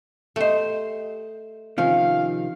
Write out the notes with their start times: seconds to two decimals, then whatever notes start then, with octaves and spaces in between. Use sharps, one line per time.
0.36 A3 G4 C5 D#5
1.78 C3 D#3 F3 C#4 F5